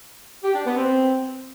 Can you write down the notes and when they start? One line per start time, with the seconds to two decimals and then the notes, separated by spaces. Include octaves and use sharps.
0.44 G4
0.55 D4
0.66 B3
0.77 C4